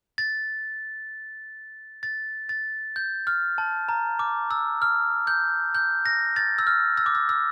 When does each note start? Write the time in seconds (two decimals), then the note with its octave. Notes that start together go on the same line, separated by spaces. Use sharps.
0.18 A6
2.03 A6
2.49 A6
2.96 G6
3.27 F6
3.58 A5
3.89 A#5
4.19 D6
4.51 E6
4.82 F6
5.27 G6
5.75 G6
6.06 A#6
6.36 A6
6.58 E6
6.67 F6
6.97 E6
7.06 D6
7.15 E6
7.29 E6